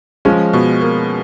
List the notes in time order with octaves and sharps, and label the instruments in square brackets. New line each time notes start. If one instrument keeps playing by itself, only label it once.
[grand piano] F3 G#3 [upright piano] C#4
[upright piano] B2
A#3